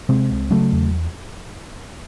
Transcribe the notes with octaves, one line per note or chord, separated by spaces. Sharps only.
C3 G#3 C4
C#2
C#3 F#3 A3
E2